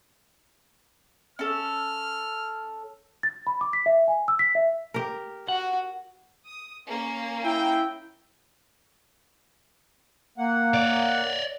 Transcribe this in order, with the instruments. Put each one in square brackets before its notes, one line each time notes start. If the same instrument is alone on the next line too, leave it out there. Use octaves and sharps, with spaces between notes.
[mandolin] C#4 A4 [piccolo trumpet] F6
[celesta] A6
B5
D6
B6
E5
G#5
E6
B6
E5
[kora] G4 A#4
[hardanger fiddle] F#4 [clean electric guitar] F#5
[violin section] D#6
A#3 C#4
[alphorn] E4 [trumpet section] G5
[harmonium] A#3 F#5
[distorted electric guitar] C#5 D5